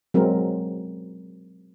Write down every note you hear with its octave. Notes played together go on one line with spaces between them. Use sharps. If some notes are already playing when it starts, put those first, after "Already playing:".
F#3 G#3 C4 A#4